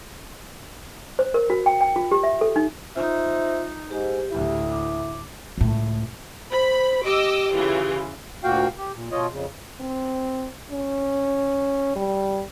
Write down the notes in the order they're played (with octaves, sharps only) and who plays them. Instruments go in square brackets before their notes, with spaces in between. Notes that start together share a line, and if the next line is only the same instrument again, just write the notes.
[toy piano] C5
A#4
F#4
G5
G5
F4
G4
E5
A4
D#4
[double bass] D#4 [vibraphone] F4 [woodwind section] C5 E5
[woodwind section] G#2 [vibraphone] G4
[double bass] D2 A2 [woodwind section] E4
[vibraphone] D6
[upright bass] C#2 A2
[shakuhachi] C5 [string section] B5
[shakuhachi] G4 [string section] D#5 D6 E6
[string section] C#3 E3 F4
[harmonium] D2 A#2 A#3 F#4 F5 G5
G4
A#2
B2 F4 C#5 D#5
F2 C#3
[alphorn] C4
C#4
G3